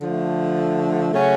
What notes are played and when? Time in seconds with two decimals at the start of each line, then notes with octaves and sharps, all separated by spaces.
0.01 D3 F3 A3
1.14 C#3 F#3 A3 C#4 F#4